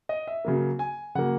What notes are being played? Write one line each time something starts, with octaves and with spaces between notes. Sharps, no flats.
D#5
E5
C#3 F#3 A#3
G#5
C#3 F#3 A#3 F#5